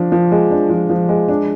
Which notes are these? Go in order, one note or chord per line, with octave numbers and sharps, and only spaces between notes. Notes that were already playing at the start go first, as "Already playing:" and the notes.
Already playing: F3 D4
F3
G#3
D4
F3
F3
G#3
D4